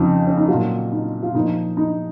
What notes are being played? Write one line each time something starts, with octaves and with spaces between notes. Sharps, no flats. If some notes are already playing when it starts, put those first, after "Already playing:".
Already playing: F2 C#3 F3 D#4
C#4
D#4
F#3 F4
A#2
D#4
F4
A#2 F3 D#4
D#4